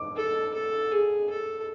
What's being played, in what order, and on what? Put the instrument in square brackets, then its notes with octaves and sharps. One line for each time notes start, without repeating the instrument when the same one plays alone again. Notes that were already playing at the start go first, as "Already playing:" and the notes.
Already playing: [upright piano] D6
[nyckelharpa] A4
A4
G#4
A4